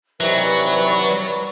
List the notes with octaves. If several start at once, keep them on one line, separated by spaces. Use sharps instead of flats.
C3 D#3 E3 F#3 B4 D5 C#6